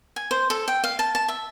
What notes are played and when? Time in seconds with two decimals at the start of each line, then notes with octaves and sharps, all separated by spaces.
0.16 G#5
0.31 C5
0.50 A4
0.68 G5
0.84 F5
0.99 A5
1.15 A5
1.28 E5